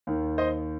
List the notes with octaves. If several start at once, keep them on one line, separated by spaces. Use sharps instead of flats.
D#2 D#3
C5 D#5